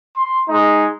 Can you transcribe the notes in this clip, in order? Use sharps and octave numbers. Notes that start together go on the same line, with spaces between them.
C6
G#3 D#4